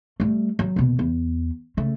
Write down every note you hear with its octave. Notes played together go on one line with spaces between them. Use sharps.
G3 A3
F#3
D#2 B2
E2
C#3 A3